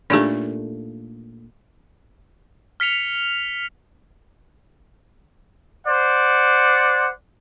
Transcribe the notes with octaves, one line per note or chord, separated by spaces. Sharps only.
A#2 A3 D4 D#4 G4
F6 B6 C#7 F7
C5 D5 F#5